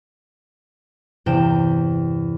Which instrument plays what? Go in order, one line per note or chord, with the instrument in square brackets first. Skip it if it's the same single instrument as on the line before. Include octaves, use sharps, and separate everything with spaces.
[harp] E2 G2 C3 G5 E7